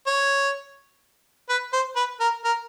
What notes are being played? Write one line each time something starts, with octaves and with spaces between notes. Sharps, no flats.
C#5
B4
C5
B4
A#4
A#4